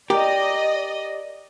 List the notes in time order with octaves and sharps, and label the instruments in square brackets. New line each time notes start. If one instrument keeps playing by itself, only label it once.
[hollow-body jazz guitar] G4 A#4 [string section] D5 D#5